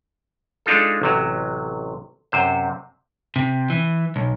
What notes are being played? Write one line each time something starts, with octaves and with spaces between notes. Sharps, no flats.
G#3 D4 D#4 F4 A4
A1 C3 F#3
F#2 C3 C5
C3
E3
B1